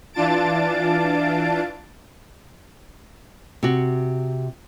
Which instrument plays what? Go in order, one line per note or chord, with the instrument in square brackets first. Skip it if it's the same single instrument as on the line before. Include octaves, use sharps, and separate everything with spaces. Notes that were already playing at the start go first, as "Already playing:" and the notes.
[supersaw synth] E3 D4 F4 A5 A6 D7
[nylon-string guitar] C3 F#4